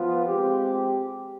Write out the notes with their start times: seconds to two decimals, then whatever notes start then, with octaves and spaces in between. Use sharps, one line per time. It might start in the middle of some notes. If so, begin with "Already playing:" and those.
Already playing: F3 B3 F4
0.26 G#3 C4 G4